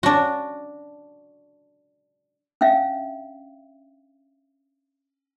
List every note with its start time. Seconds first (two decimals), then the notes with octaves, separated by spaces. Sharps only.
0.03 D4 F#4
2.61 C#4 D4 E5 F5